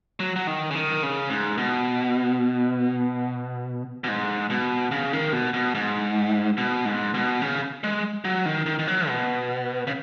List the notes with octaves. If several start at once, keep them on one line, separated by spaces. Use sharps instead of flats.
F#3
F#3
D#3
C#3
D#3
C#3
G#2
B2
B2
G#2
B2
C#3
D#3
B2
B2
G#2
B2
G#2
B2
C#3
G#3
F#3
D#3
D#3
D#3
F#3
B2
C#3